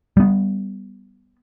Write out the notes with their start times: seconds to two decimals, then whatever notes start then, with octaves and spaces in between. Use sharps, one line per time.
0.17 G3 B3